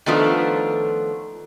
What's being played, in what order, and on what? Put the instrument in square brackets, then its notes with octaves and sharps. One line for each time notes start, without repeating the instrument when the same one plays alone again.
[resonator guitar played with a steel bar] D#3 F3 A3 B3 D4 F4